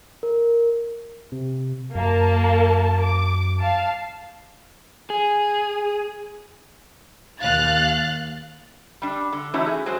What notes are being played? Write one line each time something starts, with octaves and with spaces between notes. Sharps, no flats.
A#4
C3
F#2 A#3 A5
D6
F5 A5
G#4
D#2 F5 F#6 A6
G3 D4
D3
E3 A3 C#4 D#4 E4 F#4
G#4
F#3 G#3 F#4 C5